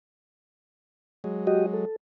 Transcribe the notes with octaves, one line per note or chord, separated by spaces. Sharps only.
F#3 G#3
F#4 G4 D#5
A4